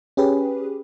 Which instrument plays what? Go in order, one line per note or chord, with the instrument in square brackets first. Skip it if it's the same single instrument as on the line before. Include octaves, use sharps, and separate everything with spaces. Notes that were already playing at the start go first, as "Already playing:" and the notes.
[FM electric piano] C#4 G4 G#4 B4